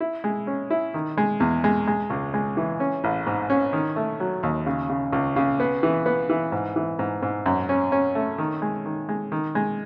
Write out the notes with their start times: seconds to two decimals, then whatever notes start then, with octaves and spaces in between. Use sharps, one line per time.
0.01 E4
0.24 G#3
0.47 C#4
0.70 E4
0.94 D#3
1.18 G#3
1.40 E2
1.64 G#3
1.87 G#3
2.10 C#2
2.34 G#3
2.57 E3
2.80 C#4
3.04 A1
3.27 G#2
3.50 C#4
3.73 D#3
3.96 A3
4.20 F#3
4.43 D#2
4.66 C#3
4.89 C#3
5.12 C#2
5.36 C#3
5.60 B3
5.83 E3
6.06 B3
6.30 E3
6.52 G#2
6.76 E3
6.99 G#2
7.22 G#2
7.46 F#2
7.69 C#4
7.92 C#4
8.15 A3
8.38 D#3
8.62 G#3
8.86 D#3
9.09 G#3
9.32 D#3
9.55 G#3